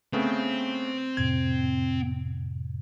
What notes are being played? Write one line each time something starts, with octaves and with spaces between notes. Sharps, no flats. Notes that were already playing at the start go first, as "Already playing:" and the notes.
C#3 A3 B3 C4
F2 A2 C3 G#6